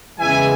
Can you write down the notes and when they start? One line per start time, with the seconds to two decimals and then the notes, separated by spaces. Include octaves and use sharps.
0.18 E2 C#3 E3 G#3 E5 G#5